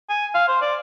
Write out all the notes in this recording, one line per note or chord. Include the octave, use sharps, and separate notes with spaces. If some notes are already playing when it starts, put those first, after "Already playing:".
G#5
F5
C5
D5